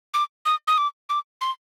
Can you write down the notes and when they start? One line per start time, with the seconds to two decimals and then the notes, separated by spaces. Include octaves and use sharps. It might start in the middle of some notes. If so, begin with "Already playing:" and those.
0.14 D6
0.46 D#6
0.68 D#6
0.78 D6
1.09 D6
1.41 C6